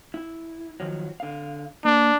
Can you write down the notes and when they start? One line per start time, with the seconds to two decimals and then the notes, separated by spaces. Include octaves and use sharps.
0.14 E4
0.80 D#3 F3 F#3
1.20 D3 F5
1.85 A#3 D4